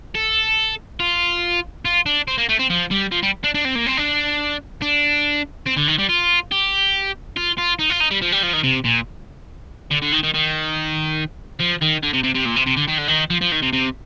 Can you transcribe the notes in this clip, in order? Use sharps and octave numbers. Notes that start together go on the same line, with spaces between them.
A4
F4
F4
D4
C4
A#3
A3
C4
F3
G3
F3
G3
D4
D4
C4
A#3
C4
D4
D4
C4
D3
D#3
G3
F4
G4
F4
F4
D#4
F4
D#4
G3
F3
G3
F3
D#3
C3
A#2
D3
D3
D#3
D#3
D#3
F3
D#3
D3
C3
C3
C3
A#2
C3
C3
D3
D#3
D3
D#3
F3
F3
D#3
C3
C3